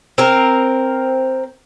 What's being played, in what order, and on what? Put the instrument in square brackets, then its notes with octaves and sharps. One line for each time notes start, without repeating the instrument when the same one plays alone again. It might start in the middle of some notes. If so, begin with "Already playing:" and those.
[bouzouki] C4 A#4